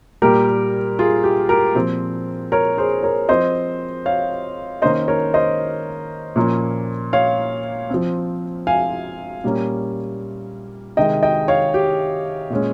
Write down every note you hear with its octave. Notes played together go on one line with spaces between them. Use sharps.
A#2 G3 A#3 G4 A#4
F4 G#4
G4
G4 A#4
A#2 F3 C4
A#4 C#5
G#4 C5
A#4 C#5
F3 C4 C5 D#5
C#5 F5
D#3 A#3 C#4 C5 D#5
A#4 C#5
C5 D#5
A#2 F3 A#3 C#4
C#5 F5
F3 C4
F5 G#5
A#2 G3 A#3 C#4
C3 D#3 G#3 D#5 G5
D#5 G5
C#5 F5
G4
A#2 G#3 C#4